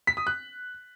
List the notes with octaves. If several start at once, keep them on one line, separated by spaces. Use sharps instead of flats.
B6
D#6
F#6